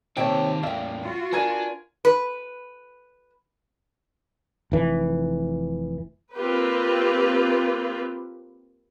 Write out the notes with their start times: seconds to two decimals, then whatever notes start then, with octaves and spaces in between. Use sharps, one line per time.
0.17 C3 D#3 A#3 C#5 E5 G5 A5 D7
0.63 E2 A2 E5 F5 G5
1.01 F4 F#4
1.33 D4 A#4 B4 G#5 G#6 D#7
2.05 B4
4.72 F1 E3
6.34 A#3 C4 F4 G4 B4